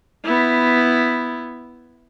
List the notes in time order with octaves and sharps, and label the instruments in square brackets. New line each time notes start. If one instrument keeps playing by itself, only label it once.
[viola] B3 E4